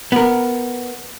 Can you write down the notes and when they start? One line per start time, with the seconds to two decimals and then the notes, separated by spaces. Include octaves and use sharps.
0.12 B3 A#4